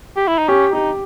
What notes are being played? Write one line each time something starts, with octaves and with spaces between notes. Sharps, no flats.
G4
E4
D#4
C#4 G4
D#4 G4